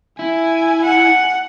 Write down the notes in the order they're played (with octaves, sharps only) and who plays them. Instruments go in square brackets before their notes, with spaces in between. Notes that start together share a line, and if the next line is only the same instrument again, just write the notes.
[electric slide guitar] E4 [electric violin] G#5
[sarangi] F#5